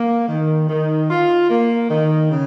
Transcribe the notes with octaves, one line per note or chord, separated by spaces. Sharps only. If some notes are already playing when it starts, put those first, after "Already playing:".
Already playing: A#3
D#3
D#3
F4
A#3
D#3
C#3